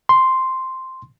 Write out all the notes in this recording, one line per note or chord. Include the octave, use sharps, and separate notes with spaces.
C6